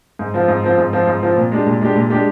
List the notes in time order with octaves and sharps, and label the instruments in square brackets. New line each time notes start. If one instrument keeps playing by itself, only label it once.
[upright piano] G#2
F3 C4 F4
G#2
F3 C4 F4
G#2
F3 C4 F4
G#2
F3 C4 F4
A#2
G#3 D4 G4
A#2
G#3 D4 G4
A#2
G#3 D4 G4